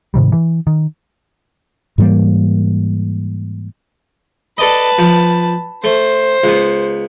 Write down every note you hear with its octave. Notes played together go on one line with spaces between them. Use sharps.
G#2 C3 D#3 G3
E3
D#3
G#2 E3 G3 A#3
A4 B4 D5 D#5 A5
F3
A3 C5
C#2 B3